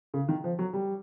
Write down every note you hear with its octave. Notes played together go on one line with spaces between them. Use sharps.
C#3
D#3
F3
F#3
G3